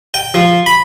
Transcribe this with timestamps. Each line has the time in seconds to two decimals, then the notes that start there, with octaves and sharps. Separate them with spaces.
0.14 G5
0.34 F3
0.66 B5